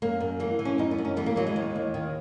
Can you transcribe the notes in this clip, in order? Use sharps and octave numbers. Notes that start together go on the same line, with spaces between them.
F#2 A#3
F#2
E3 A#3
E3
C#4
F#2 D#4
B3
F#2
C#4
E3 B3
A#3
E3 F#3
G#3
D#2
D#2
D#3